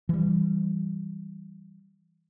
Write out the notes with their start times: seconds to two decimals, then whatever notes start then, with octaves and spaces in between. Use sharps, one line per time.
0.09 E3 G3